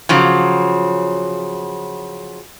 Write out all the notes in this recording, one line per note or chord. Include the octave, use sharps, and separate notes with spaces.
C#3 F3 F#3